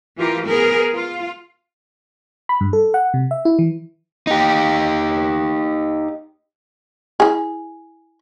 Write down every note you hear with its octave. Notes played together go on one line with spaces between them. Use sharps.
E3 F4 G4 A#4
B3 G#4 A#4 B4
F4
B5
G2
A4
F#5
C3
E5
E4
E3
D#4 G4
E4 G#4